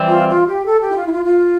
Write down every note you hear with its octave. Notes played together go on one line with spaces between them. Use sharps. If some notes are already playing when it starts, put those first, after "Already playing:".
Already playing: E3 G3 C4
F4
F4
G4
A4
G4
E4
F4
E4
F4
F4